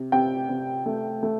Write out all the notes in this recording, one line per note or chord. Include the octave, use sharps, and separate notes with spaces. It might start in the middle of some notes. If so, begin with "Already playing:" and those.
Already playing: C3
C3 G5
C3
A3
A3